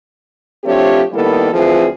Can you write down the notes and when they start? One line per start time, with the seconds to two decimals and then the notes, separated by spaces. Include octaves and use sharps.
0.64 F3 A3 C4 D4 G4 C#5
1.13 D#3 G3 A#3 B3 E4 A4
1.53 D2 E3 F3 C4 F4 G#4